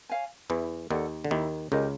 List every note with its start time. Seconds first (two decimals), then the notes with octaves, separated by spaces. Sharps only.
0.09 C#5 F5 G#5
0.49 E2 E3 E4
0.91 D#2 D#3 A4 D5 F#5
1.25 D3
1.31 D#2 D#3 E4
1.72 C#2 C#3 G4 A#4 D#5